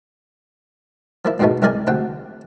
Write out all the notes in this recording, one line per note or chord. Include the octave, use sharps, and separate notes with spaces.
F3 A#3 E4
C#2 G#2 B2 G#3 A3 B3
C2 G#3 A#4 D5 D#5 G#5
D2 C3 F#5 G5